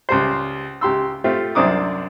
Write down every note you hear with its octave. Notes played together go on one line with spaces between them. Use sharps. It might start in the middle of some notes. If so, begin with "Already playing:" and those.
C#2 G3 C5
C#2 G4 C6 E6
A3 C4 F4 G4
C2 F#2 C4 D4 D6 D#6